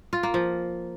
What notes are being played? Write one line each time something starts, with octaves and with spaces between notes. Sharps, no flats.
F4
A#3
F3